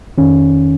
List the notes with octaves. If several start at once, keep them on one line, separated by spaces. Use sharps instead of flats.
F2 D#3 C#4